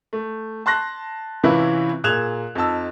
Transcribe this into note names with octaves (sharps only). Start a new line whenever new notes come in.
A3
A5 C6 F#6 A#6
C3 E3 C#4 E4 F4 B4
A#2 G#4 F#6 G#6 E7 F7
F2 D#4 A5 E6